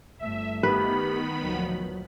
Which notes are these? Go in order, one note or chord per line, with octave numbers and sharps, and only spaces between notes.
G1 G2 A3 E5
D#3 B3 G4 B4 B5
D2 A#2 F3 F#3